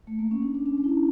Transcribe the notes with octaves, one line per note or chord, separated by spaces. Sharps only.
A3
A#3
C#4
D4
D4
C#4
C#4
E4
D4